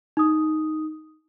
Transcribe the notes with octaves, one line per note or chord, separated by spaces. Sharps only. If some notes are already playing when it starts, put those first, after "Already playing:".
D#4 D#6